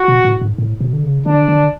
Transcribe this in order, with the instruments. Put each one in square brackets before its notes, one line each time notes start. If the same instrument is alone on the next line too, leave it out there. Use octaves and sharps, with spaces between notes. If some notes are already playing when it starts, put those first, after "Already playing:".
Already playing: [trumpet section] F#4
[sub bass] B2
A2
G#2
A2
B2
D3
C#3
[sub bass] D3 [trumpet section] D4
[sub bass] D3